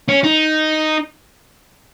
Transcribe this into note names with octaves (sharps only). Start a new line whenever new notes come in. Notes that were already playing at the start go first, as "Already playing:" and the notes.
C#4
D#4